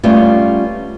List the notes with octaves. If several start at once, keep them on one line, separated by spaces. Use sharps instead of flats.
G3 A3 B3 C#4 F4